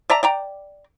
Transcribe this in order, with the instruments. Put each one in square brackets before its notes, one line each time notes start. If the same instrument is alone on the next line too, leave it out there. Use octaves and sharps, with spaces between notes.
[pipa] D5 E5 A5 A#5
D5 G5 A#5